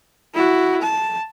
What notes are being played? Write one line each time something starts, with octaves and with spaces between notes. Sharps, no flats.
E4 F#4
A5